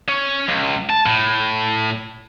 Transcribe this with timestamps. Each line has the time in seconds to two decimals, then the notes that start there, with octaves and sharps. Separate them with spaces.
0.09 C#4
0.48 C#2
0.90 A5
1.06 A2